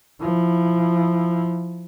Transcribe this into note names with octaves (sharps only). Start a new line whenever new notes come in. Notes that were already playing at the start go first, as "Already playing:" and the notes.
F3 E4